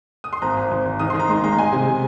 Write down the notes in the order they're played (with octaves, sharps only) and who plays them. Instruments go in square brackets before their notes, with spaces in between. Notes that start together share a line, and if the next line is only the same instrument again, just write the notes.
[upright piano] D#6
C6
G#1 A#5
G#1
G#1
G#1
D#3 D#6
D#3 C6
A#5
G#3 C6
G#3 A#5
G#3 G#5
C3
C3